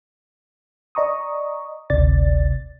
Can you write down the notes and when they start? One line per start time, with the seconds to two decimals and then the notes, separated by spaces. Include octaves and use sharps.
0.95 D5 D#5 A#5 C#6 D#6
1.90 G#1 D2 C3 D5 A6